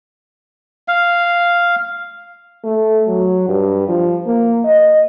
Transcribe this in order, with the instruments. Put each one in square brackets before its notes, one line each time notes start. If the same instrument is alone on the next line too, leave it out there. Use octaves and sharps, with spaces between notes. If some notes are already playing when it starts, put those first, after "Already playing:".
[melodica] F5
[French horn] A3
F#3
G2
F3
A#3
D#5